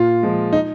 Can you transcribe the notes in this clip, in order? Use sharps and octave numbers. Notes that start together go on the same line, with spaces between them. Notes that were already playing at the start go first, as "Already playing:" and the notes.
Already playing: A#2 F4
F3 G#3
D#4